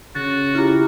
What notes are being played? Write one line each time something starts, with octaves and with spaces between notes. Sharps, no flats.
C#3 F#4 A6
E4 F4 G4 A#5